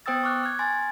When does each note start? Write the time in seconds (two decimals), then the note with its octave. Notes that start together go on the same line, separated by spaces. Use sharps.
0.06 B3 C5 G5 D#6 E6 A6
0.23 C#6 D6 F6 F#6
0.43 F6 G#6
0.59 G#5 C6 G#6 A6